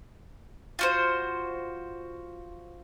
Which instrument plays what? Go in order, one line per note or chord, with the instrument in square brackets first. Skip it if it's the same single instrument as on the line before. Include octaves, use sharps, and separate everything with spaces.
[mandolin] F4 F#4 C5